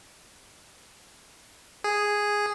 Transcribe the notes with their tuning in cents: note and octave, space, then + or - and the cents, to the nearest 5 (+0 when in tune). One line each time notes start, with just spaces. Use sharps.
G#4 -5